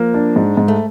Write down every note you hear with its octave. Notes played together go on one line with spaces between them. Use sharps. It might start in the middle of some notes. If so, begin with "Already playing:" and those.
Already playing: F3 A#3
D4
G#2
G#2
A3